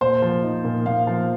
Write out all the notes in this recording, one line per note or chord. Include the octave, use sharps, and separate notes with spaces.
A#2 C5
F3
D#4
A#2
A#2 F5
F3